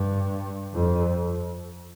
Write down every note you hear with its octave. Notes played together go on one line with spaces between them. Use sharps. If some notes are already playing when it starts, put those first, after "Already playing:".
Already playing: G2
F2